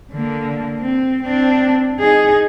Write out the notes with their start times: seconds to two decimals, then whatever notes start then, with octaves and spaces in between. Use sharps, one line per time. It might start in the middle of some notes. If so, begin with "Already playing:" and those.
0.12 D3 A#3
0.80 C4
1.23 C4 D4
1.99 D#4 G#4